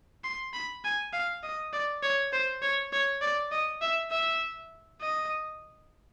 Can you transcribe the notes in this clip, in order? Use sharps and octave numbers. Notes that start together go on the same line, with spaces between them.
C6
B5
G#5
F5
D#5
D5
C#5
C5
C#5
C#5
D5
D#5
E5
E5
D#5